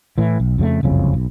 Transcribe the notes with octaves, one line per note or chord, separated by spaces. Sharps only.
A2 E3
B1
F2 C#3 G3 A3
F#1 C2 F2 C#3
B1